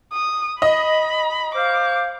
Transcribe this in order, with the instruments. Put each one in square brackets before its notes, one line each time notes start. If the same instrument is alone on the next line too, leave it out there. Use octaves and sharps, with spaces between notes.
[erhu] D#6
[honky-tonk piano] D#5 [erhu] B5
[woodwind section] C5 F5 [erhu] D6